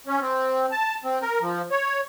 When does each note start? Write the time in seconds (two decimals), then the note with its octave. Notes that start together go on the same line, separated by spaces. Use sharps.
0.07 C#4
0.21 C4
0.71 A5
1.04 C4
1.22 A#4
1.42 F3
1.71 C#5